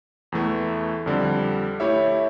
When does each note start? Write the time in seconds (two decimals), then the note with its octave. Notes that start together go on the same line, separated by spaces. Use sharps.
0.32 E2 E3 A3
1.06 F2 D3 G3
1.80 A3 E4 G4 C#5 E5